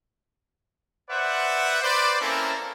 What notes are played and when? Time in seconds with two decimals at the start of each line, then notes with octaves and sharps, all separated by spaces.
1.10 B4 C5 D5 E5 F#5
1.82 B4 C5 D5
2.20 A#3 C4 C#4 E4 A4 A#4